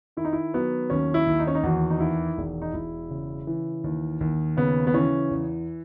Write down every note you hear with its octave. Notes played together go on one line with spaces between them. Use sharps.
D#3 E4
D#4
E4
F#3 B3
D#2 C#4
E4
D#2
D#4
C#4
D#4
E2 F#4
D#4
D#3 E4
E1
D#4
E1 E4
C#3
E3
D#2
D#2
C#3 B3
B3
E3 C#4
E2